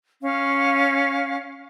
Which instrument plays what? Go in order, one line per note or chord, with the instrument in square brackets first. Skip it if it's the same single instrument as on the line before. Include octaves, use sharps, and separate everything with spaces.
[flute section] C#4 F5